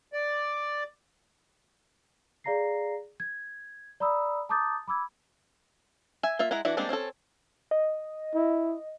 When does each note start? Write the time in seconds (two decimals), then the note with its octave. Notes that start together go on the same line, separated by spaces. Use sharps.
0.13 D5
2.44 G#4 D5 F5 A#5 A#6 C7
3.20 G#6
4.00 D5 A#5 B5 D#6 E6
4.49 A5 A#5 D6 D#6 G6 A6
4.88 B5 D6 E6 G#6
6.23 E5 G#5
6.39 A#3 F4 E5
6.51 G#3 E4 F#5 A#5
6.65 E3 D4 E4 F#4
6.77 G3 G#3 A#3 C4 D4
6.89 C4 C#4 D#4 A4
7.71 D#5
8.35 E4